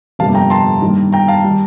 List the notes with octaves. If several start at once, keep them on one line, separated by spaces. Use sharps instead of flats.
G1 F2 C3 G3 A#3 F5 A5
G5 A#5
A5 C6
G2 D#3 G3 A#3
G5 A#5
F5 A5
D#3 G3